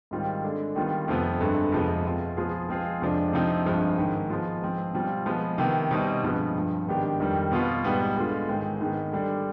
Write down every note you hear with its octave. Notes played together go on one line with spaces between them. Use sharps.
G#2 D#3 G3 C4 F4
D3 G#3 D4
D#3 G3 B3 F4
F2 C3 F3 B3
G2 D3 G#3
F2 C3 F3 G#3 B3
B2 G#3 C4 F4
F3 B3 F4 G#4
F3 G#3 C4 F4 G#4
F2 C3 F3 G#3 D4
C3 F3 C4 D#4
G2 F3 G#3
G#2 D#3 G#3
F3 G#3 B3 F4
G#2 F3 C4
B2 G3 C4 F4
F3 G#3 B3
C3 D#3 B3
B2 G3 C4 D#4
G2 F3 G#3 B3
G2 F3 C4
G#2 D#3 B3 D4 G4
F2 D#3 G3
B2 B3 F4
G#2 G3 B3
D3 G#3 B3 F4
G#2 D#3 G#3 C4 D#4
G#2 D#3 G#3 B3
D3 G3 D4